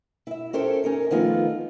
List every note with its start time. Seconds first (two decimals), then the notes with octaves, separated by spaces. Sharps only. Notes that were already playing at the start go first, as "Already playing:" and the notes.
0.27 E4 E5
0.53 C#4 G4 A4 A#4 C5 C#5
0.84 C#4 D#4 A#4
1.11 D#3 F3 A3 B3 D#4 F4